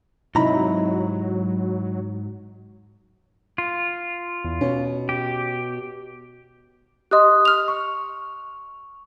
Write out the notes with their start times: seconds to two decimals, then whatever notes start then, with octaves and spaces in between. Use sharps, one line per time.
0.35 G#2 C3 F#3 D#4 E4 A#5 B5
3.58 F4
4.44 E2
4.61 B2 C#4
5.09 G4
7.11 G4 D#5 C6 D#6 F#6
7.45 F6 F7
7.68 C#6